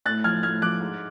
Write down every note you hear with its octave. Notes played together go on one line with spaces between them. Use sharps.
A2 F#6 A6
F3 F6 G#6
A2 F6 G#6
F3 D6 F#6
G#2